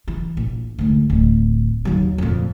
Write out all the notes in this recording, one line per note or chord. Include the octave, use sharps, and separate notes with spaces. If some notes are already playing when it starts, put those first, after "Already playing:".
E3
A#1
D2 G#2
D1
D#2 F#3
F2 A#2